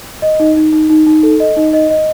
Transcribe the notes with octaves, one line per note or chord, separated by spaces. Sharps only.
D#5
D#4
D#4
D#4
D#4
D#4
A4
D#5
D#4
D#5
D#5